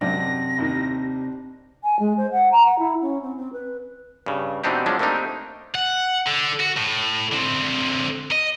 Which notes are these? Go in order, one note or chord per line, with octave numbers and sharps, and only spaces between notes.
G#1 F#2 C3 D4 A#6
A1 D#2 D#3
G#5
G#3
C5
F#5
A#5
F#5
E4
C#4
C4
C4
B4
G2 C#3
B2 E3 C4 D4 D#4 G4
F3 F#3 G#3 C#4 D4
A3 A#3 C4 D4 D#4 G4
F#5
D3
F#4
A2
D3 C4
D#5